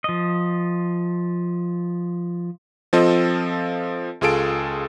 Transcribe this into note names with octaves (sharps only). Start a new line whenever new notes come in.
F3 D#5
F3 C4 F4 A4 D#5
C#2 F4 G#4 A4 D7